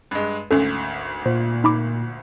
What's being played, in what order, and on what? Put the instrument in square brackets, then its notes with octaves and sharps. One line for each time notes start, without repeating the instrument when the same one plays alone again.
[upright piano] G2 G#3
[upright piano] G#1 D2 [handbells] C#4 A4
[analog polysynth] A#2 [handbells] C5
[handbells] D#4 B5 D6